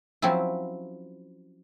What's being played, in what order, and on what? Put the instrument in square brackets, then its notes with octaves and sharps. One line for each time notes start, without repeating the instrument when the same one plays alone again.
[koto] F3 F#3 C4 C#4 E4